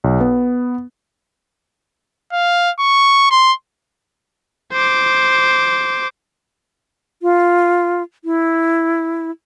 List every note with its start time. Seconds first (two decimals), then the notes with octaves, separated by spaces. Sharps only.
0.04 B1
0.21 B3
2.32 F5
2.80 C#6
3.31 C6
4.72 C5 D6
7.22 F4
8.25 E4